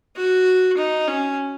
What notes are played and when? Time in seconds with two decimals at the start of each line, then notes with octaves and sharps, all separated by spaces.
0.16 F#4
0.77 D#4
1.08 C#4